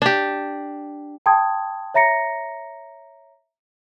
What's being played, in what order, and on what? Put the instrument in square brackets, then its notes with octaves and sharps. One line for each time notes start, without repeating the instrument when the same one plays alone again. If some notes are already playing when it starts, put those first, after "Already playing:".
[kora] D4 G4
[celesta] G5 A5 C6 D#6 G#6
C#5 E5 A#5 A#6 C#7